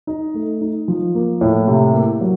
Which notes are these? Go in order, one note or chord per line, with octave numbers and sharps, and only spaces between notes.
D#4
A3
D#4
F3
A#3
A2
C3
A#3
F#3